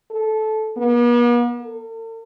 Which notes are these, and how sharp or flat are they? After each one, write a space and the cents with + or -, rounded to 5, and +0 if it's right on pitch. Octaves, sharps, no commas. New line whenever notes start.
A4 -15
B3 -45
A4 +45